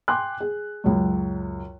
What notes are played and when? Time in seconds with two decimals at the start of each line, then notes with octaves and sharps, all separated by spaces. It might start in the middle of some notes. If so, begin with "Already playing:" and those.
0.08 G5 G#5 C6 D6 F#6
0.40 G#4
0.84 C#2 F#2